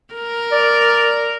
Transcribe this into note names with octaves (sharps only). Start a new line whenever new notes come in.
A#4
D5